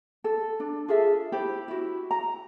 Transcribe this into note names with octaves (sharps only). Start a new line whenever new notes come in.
A4
D4
F4 G#4 A4 E5
E4 G4 C5 B5
E4 F#4
A#5